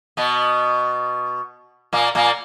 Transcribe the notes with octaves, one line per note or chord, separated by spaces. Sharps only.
B2 B3
A#2 A#3
A#2 A#3